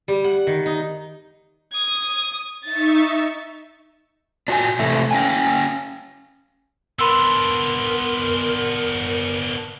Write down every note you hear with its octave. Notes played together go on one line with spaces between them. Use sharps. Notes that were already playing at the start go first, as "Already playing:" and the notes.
G3
F#5
D#3
D#4
D#6 G#6
D#4 E5 C#6 A6
D4 F4 F#4 A4 G5 G#5
C3 E3 A3 E4
C#4 F5 G5 G#5
B3 D4 A#4 B5 C6 E6